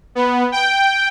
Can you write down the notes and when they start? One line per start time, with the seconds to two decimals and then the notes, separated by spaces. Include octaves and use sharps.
0.15 B3
0.52 G5